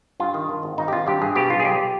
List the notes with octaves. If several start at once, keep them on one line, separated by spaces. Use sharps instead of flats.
G2 F4
D#3
D#3
G#1
G#1 D#4
G4
G#1 F4
G2 G4
G2 G#4
B2 G4
B1 F4
G#4
B1 G4